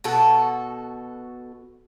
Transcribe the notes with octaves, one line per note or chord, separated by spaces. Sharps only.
B2 F#4 A4